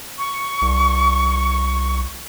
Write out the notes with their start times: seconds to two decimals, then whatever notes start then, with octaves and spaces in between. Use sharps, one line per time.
0.18 C#6
0.62 C2